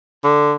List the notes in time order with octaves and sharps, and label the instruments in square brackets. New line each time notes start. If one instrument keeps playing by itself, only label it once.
[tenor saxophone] D3